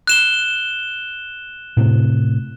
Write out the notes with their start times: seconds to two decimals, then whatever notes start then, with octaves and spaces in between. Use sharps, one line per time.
0.07 F#6 E7 G7
1.77 A2 C3